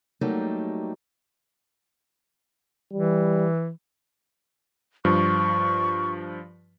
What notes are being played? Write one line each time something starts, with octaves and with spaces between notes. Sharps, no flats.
F#3 G3 A3 A#3 D#4 G4
E3 G3
G2 F3 C#6